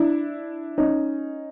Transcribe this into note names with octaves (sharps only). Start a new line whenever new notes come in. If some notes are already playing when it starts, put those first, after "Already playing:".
Already playing: D4 E4
C#4 D#4